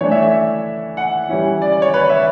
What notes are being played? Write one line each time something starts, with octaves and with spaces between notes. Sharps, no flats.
E3 A3 D4 C#5
E5
E5
F#5
E3 G3 C#4 E4
D5
D5
C#5
B4
C#5
E5